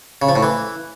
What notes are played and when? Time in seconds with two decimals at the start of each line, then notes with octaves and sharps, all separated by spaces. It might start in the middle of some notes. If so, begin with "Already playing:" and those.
0.22 C#3
0.29 F3
0.36 A2
0.43 E3